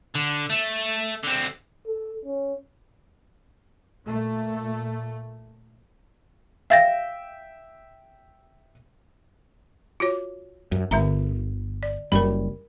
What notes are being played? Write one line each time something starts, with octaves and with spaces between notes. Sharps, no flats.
D3
A3
D3 C4
A4
C#4
A#2 A3
E5 F5 G5 A6 A#6
F4 F#4 C#5
F#2
G1 D3 E5 A#5
D5
F#1 F#2 G3 A#4 B5